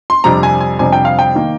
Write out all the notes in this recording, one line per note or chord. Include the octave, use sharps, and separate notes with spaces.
C6
F2 C3 G3 D4 A#5
G#5
G#5
F2 C3 G3 D4 G#5
G5
F5
G5
D#3 A#3